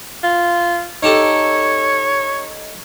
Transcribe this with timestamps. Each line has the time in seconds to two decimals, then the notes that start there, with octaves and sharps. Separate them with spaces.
0.24 F4
1.03 D#4 G4 A4 C#5